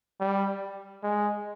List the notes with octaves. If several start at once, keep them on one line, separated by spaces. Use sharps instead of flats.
G3
G#3